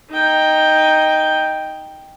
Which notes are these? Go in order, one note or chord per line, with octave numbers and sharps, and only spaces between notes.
D#4 G5